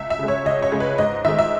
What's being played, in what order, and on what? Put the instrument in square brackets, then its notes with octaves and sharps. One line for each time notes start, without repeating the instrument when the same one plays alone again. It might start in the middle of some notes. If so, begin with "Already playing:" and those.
Already playing: [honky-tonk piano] C#2 E5
E5
C#3 G#3
C#5
C#2 D#5
C#5
C#3 G#3
B4
G#2 D#5
D#3 G#3 E5
E5